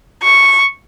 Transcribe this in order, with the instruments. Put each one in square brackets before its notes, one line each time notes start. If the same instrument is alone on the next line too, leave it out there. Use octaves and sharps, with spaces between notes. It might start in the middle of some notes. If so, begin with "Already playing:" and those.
[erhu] C#6